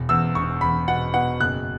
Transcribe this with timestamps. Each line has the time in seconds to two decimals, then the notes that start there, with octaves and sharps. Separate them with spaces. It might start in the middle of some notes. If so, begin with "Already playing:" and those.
Already playing: E1
0.09 E2 E6
0.35 E1 C#6
0.61 E2 B5
0.88 B2 F#5
1.14 B2 F#5
1.40 F#1 F#6